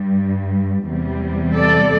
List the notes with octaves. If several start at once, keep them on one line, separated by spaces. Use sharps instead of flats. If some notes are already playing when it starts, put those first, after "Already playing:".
Already playing: G2 G3
E2 C3 G3
A4 D5